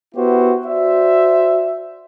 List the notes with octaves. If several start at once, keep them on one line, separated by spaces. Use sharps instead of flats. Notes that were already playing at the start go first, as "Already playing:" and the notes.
B3 E4 F#4 G4 C5
F#4 C5 D5 E5